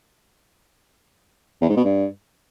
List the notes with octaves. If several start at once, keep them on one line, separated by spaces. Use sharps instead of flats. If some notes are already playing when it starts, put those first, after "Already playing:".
E2
G#2
B2
G2